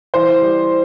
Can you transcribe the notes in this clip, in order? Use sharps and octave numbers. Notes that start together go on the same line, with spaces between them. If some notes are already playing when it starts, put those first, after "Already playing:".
E3 C5
G3